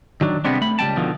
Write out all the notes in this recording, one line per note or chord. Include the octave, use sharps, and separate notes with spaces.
D#3 F#3 D4
C3 G3 G#3 B3 C4 D4
A3 B5
C#2 G3 A3 G5 A5
B2 D3 D#3 F3